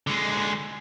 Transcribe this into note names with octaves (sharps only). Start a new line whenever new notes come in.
D3 G#3